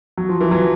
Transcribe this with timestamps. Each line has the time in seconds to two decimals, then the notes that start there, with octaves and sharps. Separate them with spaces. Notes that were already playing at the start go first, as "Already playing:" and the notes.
0.17 F#3
0.29 F3
0.41 E3
0.51 F#3